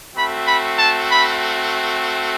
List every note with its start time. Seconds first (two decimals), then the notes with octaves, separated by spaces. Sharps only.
0.15 A3 C4 F#4 B5
0.46 B5
0.77 A5
1.07 B5